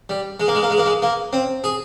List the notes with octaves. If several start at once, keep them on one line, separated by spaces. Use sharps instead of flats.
G3
G#3
A#3
G#3
A#3
G#3
A#3
G#3
A#3
C4
G#4